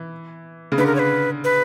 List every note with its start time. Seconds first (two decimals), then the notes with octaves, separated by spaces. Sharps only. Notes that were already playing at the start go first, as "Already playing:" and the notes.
Already playing: E3
0.72 C#3
0.78 D3 B4
0.87 A#4
0.95 C#5
0.99 B4
1.44 B4